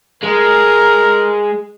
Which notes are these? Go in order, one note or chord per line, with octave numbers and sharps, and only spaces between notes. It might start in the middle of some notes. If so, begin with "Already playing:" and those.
G#3 A#4